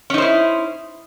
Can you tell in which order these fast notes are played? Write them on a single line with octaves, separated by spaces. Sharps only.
C#4 D#4 C5 E4